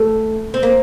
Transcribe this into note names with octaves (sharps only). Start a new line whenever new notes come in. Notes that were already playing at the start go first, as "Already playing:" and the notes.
Already playing: A3
C4
A#3